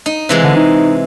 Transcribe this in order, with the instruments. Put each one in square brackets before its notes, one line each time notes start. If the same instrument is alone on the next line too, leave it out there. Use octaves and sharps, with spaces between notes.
[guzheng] D#4
C3 E3 G#3
[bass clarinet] D3
D#4